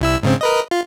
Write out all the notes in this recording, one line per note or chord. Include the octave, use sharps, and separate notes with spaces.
C2 E4 E6
G#2 C#3 C4
A#4 B4 D#5
F4